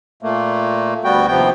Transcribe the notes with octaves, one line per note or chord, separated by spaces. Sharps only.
A#2 A3 A#3
D2 G3 B3 F#4 G5
D#2 C3 F3 B3 G5